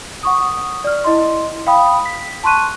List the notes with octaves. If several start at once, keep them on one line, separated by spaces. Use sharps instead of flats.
F#5 C#6 D#6
D5 F6
E4 D#5 C6
F5 G5 B5 D#6
B6
A5 C6 C#6 F#6 D#7